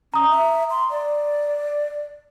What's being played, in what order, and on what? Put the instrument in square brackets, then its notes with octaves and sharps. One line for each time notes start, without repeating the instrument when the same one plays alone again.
[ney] C#4 [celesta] A#5 D#6
[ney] E5
C6
D5